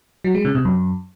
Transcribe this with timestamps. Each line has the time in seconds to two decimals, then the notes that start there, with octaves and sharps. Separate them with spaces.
0.24 F#3
0.35 G#3
0.45 C#3
0.55 C3
0.65 F#2